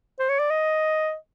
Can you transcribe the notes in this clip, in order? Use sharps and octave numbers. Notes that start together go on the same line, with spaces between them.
C5
C#5
D5
D#5